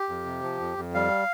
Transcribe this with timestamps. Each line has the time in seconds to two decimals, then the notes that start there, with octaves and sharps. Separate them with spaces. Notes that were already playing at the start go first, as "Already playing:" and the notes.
Already playing: G4
0.09 F2
0.26 C3
0.43 F3
0.60 F2
0.77 F2
0.94 G3 F5